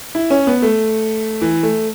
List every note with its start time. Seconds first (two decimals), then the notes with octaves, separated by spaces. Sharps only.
0.15 E4
0.30 C#4
0.47 B3
0.62 A3
1.42 E3
1.63 A3